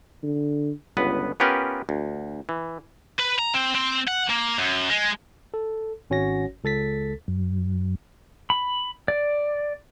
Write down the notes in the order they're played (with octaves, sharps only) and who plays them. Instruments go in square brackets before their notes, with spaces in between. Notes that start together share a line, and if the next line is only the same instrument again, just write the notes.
[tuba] D3
[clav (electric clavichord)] G1 C#2 B3 B4
B3 C#4 F4 G4 A#4 B4
D2
E3
[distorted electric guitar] B4
A#5
C4
C4
F#5
A#3
F#2
G#3
[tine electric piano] A4
G#1 C#4 F#4 C#5 F#5 A#6
C#2 A4 A6 B6
[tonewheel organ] F#2
[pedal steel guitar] B5
D5